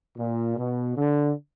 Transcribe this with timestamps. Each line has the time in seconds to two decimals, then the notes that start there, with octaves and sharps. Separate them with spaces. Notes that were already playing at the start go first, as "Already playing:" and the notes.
0.18 A#2
0.56 B2
0.96 D3